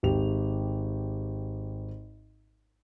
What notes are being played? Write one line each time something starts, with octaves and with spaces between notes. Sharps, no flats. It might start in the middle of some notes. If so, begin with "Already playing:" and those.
G#1 G4 F7